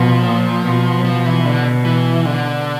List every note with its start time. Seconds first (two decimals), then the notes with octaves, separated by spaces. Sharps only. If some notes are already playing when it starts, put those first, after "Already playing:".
Already playing: B2 F3
0.25 A#2
0.65 B2
1.05 F3
1.26 E3
1.45 D3
1.85 E3
2.25 D3